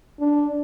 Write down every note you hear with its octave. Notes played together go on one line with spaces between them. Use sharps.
D4